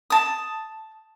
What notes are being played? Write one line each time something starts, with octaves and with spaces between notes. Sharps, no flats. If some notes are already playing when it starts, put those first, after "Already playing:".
A5 D#6